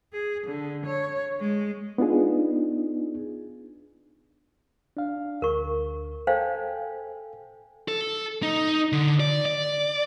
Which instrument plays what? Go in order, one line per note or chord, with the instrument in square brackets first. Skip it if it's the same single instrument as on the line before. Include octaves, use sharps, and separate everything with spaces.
[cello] G#4
D3
C#5
G#3
[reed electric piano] B3 D4 D#4 F4 G#4
D4 F5
[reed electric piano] D2 [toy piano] A#4 C#6
[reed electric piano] A4 G5 G#5 [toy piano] C5 F5
[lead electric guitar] A4
D#4
D3
D5
D5